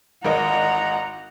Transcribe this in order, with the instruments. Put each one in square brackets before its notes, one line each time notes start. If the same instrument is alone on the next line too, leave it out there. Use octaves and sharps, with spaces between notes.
[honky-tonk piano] G#1 A#4 D#5 [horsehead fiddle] F#5 A#5